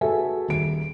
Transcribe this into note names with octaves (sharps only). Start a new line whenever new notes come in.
F#4 G#4 A4 B4 E5 G#5
D#1 D7